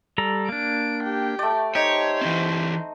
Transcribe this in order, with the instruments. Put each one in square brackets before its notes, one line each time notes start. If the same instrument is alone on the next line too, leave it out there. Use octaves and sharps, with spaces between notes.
[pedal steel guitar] G3 A4 A#5
[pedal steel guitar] A#3 D4 [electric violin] D7
[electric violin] G4 G5
[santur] A3 D5
[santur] D#4 [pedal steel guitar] G4 [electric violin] C5 [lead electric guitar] C#5
[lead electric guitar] E3 C4